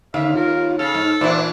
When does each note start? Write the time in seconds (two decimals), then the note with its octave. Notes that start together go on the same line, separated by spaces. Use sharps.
0.14 D#2 D3 E5 F5
0.35 F4 A#4
0.79 C#3 A4 F6
0.95 G#2
1.21 A#2 E3 D4 C5 D5 E5